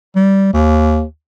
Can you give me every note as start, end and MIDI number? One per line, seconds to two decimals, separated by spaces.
0.16 0.52 55
0.53 1.03 39